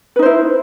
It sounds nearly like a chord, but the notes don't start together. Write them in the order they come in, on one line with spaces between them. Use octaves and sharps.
B4 D#4 C5 E4